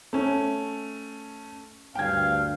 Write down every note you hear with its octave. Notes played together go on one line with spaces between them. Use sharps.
A3 C#4
D2 G2 F5 G5 G#6